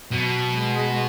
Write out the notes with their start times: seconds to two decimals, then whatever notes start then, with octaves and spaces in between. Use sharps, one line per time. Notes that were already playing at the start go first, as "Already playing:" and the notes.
0.11 B2 F#3
0.57 G#3